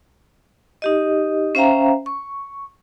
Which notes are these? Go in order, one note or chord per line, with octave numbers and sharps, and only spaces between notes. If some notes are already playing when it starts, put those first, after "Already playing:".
D#4 G4 D#5
C#4 C5 E5 F5 G5 A#5
C#6